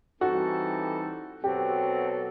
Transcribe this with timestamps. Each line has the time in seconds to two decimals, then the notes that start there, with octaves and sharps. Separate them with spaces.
0.21 E3 G3 C4 D#4 F#4 A4
1.43 B2 F#3 C4 F#4 G4 A4